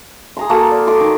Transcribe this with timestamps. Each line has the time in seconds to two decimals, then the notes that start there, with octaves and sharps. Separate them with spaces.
0.37 G#4 A#5 C6
0.50 A#3 F#4 A4 A5
0.71 D5
0.87 A4 D#5 C6 D6
1.01 D#3